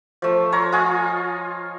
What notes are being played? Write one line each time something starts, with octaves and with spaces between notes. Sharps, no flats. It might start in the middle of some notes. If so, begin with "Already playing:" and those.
F3 A3
F4 C#5 A#5
F4 D#5 F5 G#5